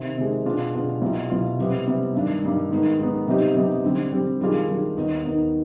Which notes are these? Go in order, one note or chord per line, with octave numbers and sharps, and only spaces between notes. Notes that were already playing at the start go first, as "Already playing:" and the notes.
Already playing: C3 D#3
C3 D#3 G#3
B2 B3 D4 F4 G#4
B2 B3 D4 F4 G#4
C2 B2 B3 F4
C2 B2 B3 F4
C3 G3 B3
C3 G3 B3
G2 D#3 G3 D4
G2 D#3 G3 D4
G#2 D#3 B3
G#2 D#3 B3
C3 G3 B3 D#4 G4
C3 G3 B3 D#4 G4
D3 G3 C4
D3 G3 C4
D#3 G3 D4 F4 G#4
D#3 G3 D4 F4 G#4
D#2 D#3 B3 D#4
D#2 D#3 B3 D#4